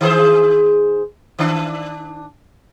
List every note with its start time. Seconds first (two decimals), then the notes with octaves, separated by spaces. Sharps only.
0.01 D#3 G#4 C5
1.39 D#3 D4